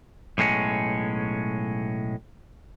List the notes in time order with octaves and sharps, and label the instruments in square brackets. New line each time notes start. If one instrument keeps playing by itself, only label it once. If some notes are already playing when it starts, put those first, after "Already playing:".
[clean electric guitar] B1 A2 G#3 C#4